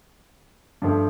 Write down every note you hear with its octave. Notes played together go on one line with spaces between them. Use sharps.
G2 F3 A3